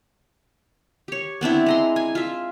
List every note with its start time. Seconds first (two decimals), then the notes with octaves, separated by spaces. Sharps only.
1.08 G4 C#5
1.41 B3 C4 D4 E4
1.66 G#3 A#5 C6
1.96 G#5
2.15 F4 E5